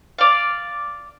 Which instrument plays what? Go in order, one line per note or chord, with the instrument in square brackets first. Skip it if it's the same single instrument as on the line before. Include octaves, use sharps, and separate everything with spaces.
[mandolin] D5 F5